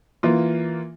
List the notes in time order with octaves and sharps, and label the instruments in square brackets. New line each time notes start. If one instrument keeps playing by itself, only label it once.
[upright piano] E3 A#3 F4